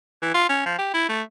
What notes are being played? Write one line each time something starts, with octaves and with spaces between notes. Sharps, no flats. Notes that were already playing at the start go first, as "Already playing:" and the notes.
E3
F4
C#4
F3
G4
E4
A3